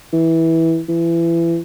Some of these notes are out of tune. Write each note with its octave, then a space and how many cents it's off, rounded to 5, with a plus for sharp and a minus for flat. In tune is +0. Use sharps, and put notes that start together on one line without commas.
E3 -15
E3 +25